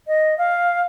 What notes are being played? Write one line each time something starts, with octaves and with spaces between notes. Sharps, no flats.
D#5
F5